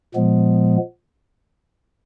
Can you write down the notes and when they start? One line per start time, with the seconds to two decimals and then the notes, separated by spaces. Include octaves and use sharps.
0.15 A#2 F3 G#3 B3